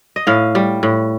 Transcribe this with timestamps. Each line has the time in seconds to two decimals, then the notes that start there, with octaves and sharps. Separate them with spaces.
0.16 D#5
0.27 A2 F5
0.55 G3
0.83 A2